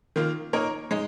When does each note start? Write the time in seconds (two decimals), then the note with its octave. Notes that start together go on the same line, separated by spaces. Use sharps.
0.16 D#3 A#3 F4
0.53 A#3 D#4 A#4 C#5
0.91 G#3 D#4